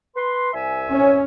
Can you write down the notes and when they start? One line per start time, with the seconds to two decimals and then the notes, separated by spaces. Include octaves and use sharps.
0.16 B4 C6
0.53 C2 E5 G#5
0.91 C#4